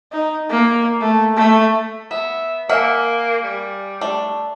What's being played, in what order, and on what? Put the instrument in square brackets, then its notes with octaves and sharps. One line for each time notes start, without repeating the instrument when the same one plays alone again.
[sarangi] D#4
A#3
A3
A3
[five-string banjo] B3 [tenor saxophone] E5
[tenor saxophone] A#3 [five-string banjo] E5 F#5 [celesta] G#5 F6
[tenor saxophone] G3
[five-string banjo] A3 D4